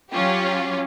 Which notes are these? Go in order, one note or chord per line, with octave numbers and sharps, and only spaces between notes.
F#3 C#4 F4 G4